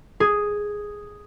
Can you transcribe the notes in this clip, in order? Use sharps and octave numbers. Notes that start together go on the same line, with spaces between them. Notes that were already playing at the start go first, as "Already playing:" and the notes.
G#4